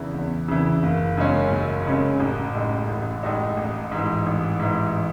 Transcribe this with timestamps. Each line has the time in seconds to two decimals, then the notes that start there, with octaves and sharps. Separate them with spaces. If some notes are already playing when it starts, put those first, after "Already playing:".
Already playing: E2 C#3 E3
0.14 E2
0.48 C#3 E3
0.83 F#1
1.17 F#2 C#3 G#3 C#4
1.51 F#1
1.86 F#2 C#3 G#3 C#4
2.20 A1
2.54 A2 G#3 D#4
2.89 A1
3.23 A2 G#3 D#4
3.57 A1
3.91 G#2 E3
4.26 A1
4.59 G#2 E3